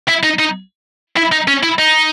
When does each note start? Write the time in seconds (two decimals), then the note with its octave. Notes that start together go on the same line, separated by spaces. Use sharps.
0.08 E4
0.23 D#4
0.39 D#4
1.17 E4
1.32 D#4
1.48 C#4
1.63 E4
1.78 D#4